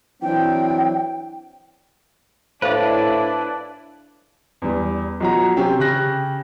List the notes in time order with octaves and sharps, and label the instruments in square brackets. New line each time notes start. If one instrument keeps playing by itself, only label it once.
[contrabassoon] E3 [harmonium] F#3 C4 D4 [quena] G5
[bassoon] A2 [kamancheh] D4 E4 [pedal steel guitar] B4 D5 [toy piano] C5 F5 D#6
[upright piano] E2 G3
B1 F3 F#3 F#4 A#5
C3 C4 C#4 G4
C#3 G4 F#6 A#6